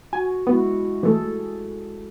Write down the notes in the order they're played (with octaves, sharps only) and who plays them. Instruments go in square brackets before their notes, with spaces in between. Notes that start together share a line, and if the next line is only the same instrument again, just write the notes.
[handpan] F#4 [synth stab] G#5
[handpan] G#3 E4 F#4 [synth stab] B3
[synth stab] E3 A3 [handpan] G#4 A4